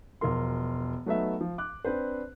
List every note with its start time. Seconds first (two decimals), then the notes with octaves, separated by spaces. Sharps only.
0.21 E1 B2 F3 A#4 C6
1.06 F#3 A3 B3 D#4 E5
1.41 F3
1.58 D6 F#6
1.85 C4 D4 B4 C5